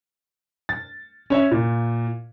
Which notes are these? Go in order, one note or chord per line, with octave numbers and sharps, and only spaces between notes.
A6
C#4 C#5 E5
A#2